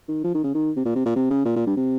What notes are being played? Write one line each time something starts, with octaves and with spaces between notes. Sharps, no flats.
D#3
F3
D#3
C#3
D#3
C3
A#2
C3
A#2
C3
C#3
A#2
A#2
G2
C3